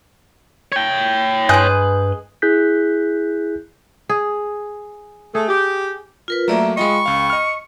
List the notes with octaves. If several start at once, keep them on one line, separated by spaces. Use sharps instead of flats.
C#5 G5
G2 G#3 G#4 B4 F#6 G6
E4 G#4 F#6 G6 B6
G#4
A3 G#4
G4
F4 A#4 B4
F#3 A3 A#3 D5 E5 A#5
G#3 F4 D#5 G5 B5 C#6
C#2 F5
D#5 F6